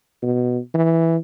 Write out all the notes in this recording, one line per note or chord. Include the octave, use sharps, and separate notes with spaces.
B2
E3